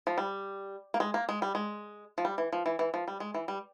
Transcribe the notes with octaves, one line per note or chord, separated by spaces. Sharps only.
F3
G3
A#3
G#3
A#3
G#3
G3
G#3
F3
G3
E3
F3
E3
E3
F3
G3
G#3
E3
G3